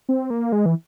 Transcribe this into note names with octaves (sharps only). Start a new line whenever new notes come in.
C4
A#3
G#3
E3